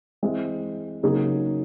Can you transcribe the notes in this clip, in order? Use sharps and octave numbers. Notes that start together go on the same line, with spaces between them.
E3 G#3 C4 E4
C#3 F#3 A#3 D#4 G#4